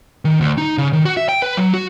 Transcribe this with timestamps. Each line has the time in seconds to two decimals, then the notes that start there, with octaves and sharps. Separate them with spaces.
0.25 D#3
0.41 D2
0.58 D#4
0.78 C#3
0.93 D#3
1.05 F#4
1.17 E5
1.29 G5
1.42 B4
1.57 F#3
1.74 F#4